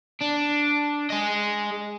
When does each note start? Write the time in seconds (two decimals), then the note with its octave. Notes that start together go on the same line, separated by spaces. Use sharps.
0.21 D4
1.10 G#4 D#5